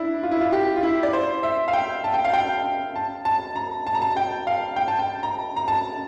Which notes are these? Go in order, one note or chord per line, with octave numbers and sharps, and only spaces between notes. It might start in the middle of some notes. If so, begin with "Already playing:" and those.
Already playing: D4 E4
F4
E4
F4
G4
F4
E4
D5
C5
E5
F5
G5
A5
G5
F5
G5
A5
A5
A#5
A5
A#5
A5
G5
F5
G5
A5
G5
A#5
A#5
A5